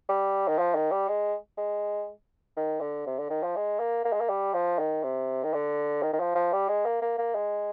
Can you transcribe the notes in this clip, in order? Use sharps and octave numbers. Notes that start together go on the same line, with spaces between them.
G3
D#3
F3
D#3
G3
G#3
G#3
D#3
D3
C3
D3
D#3
F3
G#3
A#3
A#3
G#3
A#3
G3
F3
D#3
C3
D#3
D3
D#3
D#3
F3
F3
G3
G#3
A#3
A#3
A#3
G#3